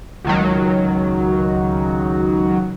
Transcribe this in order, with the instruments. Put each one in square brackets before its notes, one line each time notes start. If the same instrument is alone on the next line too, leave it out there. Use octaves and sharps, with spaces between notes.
[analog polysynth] C#2 D#3 F#3